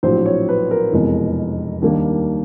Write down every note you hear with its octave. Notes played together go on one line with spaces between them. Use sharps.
A#1 A2 F#3 C5
C#5
B4
A#4
F1 E2 B2 G#3
D#2 D#3 G3 A#3 D4